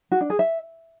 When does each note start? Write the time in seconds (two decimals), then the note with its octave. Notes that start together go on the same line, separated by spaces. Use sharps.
0.12 F#4
0.21 D4
0.30 G#4
0.39 E5